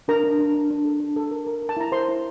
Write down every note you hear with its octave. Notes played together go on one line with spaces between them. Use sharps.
D4 A#4 A#5
D4
D4
D4
D4
A4
D4
A4
A#4
A#4
A#4
A5
E4 A#5
A#4 C5 C6
E4